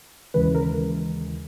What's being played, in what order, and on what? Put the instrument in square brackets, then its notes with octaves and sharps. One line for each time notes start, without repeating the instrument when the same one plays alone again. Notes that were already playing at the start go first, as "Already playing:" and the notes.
[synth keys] D#2 C#3 E3 G#3 B4
A#4